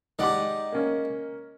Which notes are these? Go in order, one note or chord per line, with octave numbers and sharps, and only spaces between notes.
G#3 D#4 G4 D5 F#5 D6
A#3 C#4